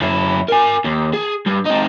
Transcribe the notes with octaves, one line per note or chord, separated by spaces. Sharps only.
F#2 E4
A#4 G#5
D#2
G#4
G2
C4 D#4